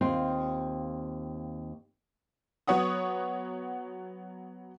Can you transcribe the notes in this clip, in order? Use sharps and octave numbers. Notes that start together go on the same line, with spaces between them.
D#2 C4 F4
F#3 B3 C#5 F#5 D#6